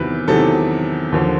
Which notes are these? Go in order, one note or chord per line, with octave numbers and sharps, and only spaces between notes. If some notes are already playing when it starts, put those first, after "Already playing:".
Already playing: E2 C3 D#3 F#3 B4
E2 C3 D#3 F#3 A4
D#2 D3 F3